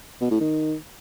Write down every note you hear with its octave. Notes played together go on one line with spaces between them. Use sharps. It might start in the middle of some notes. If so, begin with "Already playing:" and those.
B2
A2
D#3